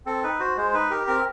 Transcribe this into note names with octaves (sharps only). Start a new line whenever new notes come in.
C4 A4
D#4 B4
F#4 C5
G#3 C5
D#4 B4
G4 A#4
C4 A#4